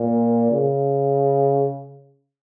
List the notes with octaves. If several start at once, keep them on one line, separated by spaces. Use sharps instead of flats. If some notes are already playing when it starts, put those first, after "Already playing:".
Already playing: A#2
C#3